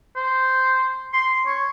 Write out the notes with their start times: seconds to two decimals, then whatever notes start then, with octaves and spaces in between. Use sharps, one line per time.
0.16 C5
1.13 C6
1.46 C#5